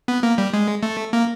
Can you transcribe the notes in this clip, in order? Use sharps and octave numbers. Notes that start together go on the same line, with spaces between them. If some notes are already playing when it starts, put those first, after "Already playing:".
B3
A#3
G3
G#3
A3
A#3